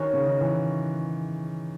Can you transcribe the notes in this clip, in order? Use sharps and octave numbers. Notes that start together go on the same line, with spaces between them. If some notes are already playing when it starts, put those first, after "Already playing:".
Already playing: D#3 C#4 F#4 C#5
C#3
D#3
E3